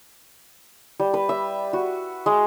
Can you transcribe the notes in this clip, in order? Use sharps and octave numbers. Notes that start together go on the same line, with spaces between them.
G3
B4
E5
F#4
G#3